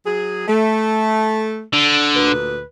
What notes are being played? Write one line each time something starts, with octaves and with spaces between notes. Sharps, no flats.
F#3 G#4
A3
D3
D2 A#2 B4